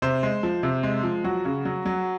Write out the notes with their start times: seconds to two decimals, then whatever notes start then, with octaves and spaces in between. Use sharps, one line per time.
0.02 C3 C5
0.23 G#3
0.43 F3
0.63 C3
0.83 G#3
1.03 F3
1.24 F#3 F#4
1.45 C#3
1.65 F#3
1.86 F#3